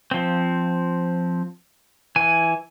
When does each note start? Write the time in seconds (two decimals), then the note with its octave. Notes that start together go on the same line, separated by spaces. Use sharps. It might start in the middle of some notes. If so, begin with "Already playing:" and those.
0.11 F3 C4
2.16 E3 G#5